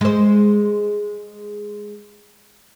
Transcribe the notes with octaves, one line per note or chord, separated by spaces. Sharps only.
G#3 C5